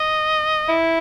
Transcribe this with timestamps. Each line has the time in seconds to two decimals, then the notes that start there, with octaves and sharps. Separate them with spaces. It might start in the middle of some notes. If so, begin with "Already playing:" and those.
Already playing: D#5
0.69 E4